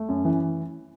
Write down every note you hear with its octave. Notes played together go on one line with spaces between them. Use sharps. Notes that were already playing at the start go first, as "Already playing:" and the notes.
Already playing: A3
F#2
E3